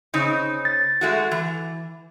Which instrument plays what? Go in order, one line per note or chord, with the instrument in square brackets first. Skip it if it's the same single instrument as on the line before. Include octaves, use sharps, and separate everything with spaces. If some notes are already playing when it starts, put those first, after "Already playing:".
[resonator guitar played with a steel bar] C#3 C4 D#4
[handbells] A6
[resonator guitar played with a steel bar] G#3 A3 F#4
E3